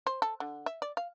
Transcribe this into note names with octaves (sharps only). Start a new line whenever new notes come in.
C5
A4
D3
E5
D5
F5